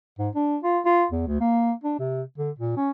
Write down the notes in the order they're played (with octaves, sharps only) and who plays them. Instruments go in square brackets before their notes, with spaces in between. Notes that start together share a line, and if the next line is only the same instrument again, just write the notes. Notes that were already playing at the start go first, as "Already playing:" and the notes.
[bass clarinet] G#2
D4
F4
F4
E2
D2
A#3
D4
C3
D3
A#2
C#4